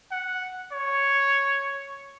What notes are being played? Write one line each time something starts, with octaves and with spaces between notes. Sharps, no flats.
F#5
C#5